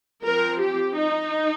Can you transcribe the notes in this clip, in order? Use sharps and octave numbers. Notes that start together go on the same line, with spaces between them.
F3 C4 A#4
G4
D#4